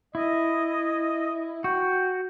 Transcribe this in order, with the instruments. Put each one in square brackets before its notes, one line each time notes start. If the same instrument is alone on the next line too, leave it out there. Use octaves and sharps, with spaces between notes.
[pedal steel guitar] E4 [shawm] D#5
[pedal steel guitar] F#4 [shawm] G5